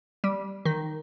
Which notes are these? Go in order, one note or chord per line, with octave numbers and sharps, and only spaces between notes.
G3
D#3